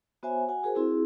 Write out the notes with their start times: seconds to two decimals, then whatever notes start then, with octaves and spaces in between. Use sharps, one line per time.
0.23 B3 F#4 C5 C#5 E5 G#5
0.49 F#4 F#5 G#5
0.63 F#4 G#4 A#4 C5
0.75 C4 E4 F#4 G#4